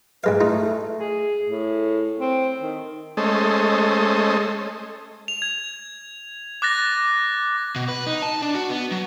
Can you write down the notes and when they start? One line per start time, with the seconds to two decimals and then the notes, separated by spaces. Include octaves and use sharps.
0.24 G#2 G#3 B4 F5
0.40 A3 D#4 F4
0.99 G#4
1.49 A2
2.20 C4
2.61 D#3
3.17 G#3 A3 C#4 A4 C5 D#5
5.28 F7
5.42 G#6
6.62 D6 F#6 A6 A#6
7.76 B2
7.88 B4
8.06 D#4
8.22 A5
8.42 D4
8.55 F#4
8.70 B3
8.92 F#3